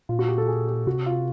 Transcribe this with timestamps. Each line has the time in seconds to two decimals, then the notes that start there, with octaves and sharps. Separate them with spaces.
0.09 A#2 F4
0.19 F#4
0.28 G4
0.38 A4
0.48 G#4
0.67 G4
0.87 C3 F#4
1.06 F4